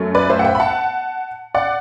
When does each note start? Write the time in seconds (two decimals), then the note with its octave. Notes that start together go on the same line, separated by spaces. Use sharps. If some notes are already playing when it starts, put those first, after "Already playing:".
Already playing: F#2 F#3 A3
0.15 B4 D5
0.30 C5 E5
0.39 F#5
0.44 E5 G5
0.55 B5
0.60 F#5 A5
1.54 D5 F#5